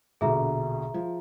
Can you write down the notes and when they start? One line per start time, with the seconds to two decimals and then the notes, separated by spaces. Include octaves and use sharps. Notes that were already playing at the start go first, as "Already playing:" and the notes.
0.21 A#1 B2 D3 G#4 E5 A#5
0.94 F3